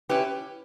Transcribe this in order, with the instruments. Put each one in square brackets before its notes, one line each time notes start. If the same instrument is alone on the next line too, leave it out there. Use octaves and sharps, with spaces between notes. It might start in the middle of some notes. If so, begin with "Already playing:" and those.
[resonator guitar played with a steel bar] C#4 E4 G4 B4